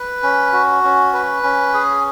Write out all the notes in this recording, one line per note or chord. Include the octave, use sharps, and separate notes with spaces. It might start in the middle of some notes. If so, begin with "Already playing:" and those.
Already playing: B4
C#4
F#4
C#4
B4
C#4
G#4